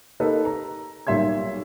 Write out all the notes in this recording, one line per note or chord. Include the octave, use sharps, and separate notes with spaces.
A#3 D#4 G4 A4 B4
A#5
B1 A#2 G3 E5 C6 G#6